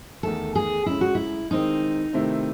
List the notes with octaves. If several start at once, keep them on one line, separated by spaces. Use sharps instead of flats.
E2 D#3 A3 A4
G#4
F#2 C#3 G#3 E4
F#4
E4
D#3 G#3 C4 D#4
C3 D#3 A3 C4 E4